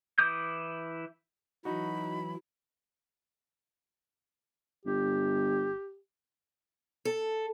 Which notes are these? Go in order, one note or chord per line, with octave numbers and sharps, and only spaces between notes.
E3 E4 D6 D#6 G6
E3 F#3 D#4 F#4 B5
G1 G4
A4